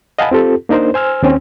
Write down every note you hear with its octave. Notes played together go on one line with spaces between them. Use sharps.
D#5 F5 F#5 G#5 A5 B5
C4 F4 G4 A4
A#3 D4 D#4 A#4 C5
C5 G#5 E6 F6
D#2 C4 C#4